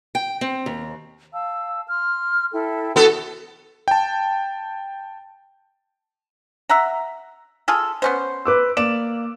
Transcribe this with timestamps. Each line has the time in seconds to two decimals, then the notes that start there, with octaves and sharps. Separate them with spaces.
0.15 G5
0.41 C4
0.66 D#2
1.33 F5 A5 E6
1.89 C6 F6
2.53 E4 A4 G5
2.96 B3 E4 F#4 A4
3.88 G5 A5
6.69 E5 F#5 A#5
7.68 F4 G#4 A4
8.02 B3 C#4 C5
8.45 B4 D6 E6
8.77 A#3 D5 E7